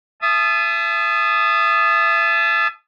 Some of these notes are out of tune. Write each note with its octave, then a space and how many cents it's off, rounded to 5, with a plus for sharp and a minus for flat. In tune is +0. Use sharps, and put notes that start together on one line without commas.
E5 +30 A5 -30 D#6 -10